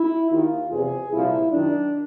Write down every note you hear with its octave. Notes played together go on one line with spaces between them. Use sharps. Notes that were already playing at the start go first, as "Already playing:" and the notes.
Already playing: E4
D#2 D#3 F4
E2 C3 F3 G#4
C2 A#2 F3 E4
F#2 D#3 D4